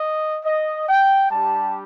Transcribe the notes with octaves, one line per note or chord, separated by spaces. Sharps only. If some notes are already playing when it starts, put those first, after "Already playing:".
Already playing: D#5
D#5
G5
G3 D4 G4 A5